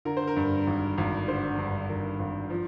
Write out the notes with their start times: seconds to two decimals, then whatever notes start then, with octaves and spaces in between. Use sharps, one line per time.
0.05 D3 A#4
0.17 C5
0.27 A#4
0.37 G2
0.67 G#1
0.98 G#1
1.28 D3 C5
1.58 G2
1.89 G#1 A#4
2.19 G#1
2.50 F3